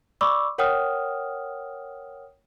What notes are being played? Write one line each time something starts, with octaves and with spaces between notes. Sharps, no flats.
D5 B5 C#6 D6 E6
A#4 C#5 F#5 G5 D#6 F6